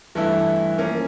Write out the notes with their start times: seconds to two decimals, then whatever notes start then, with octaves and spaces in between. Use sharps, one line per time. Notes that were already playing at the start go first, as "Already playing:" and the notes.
0.15 G2 E3 A3 E4
0.78 F3 A#3 C#4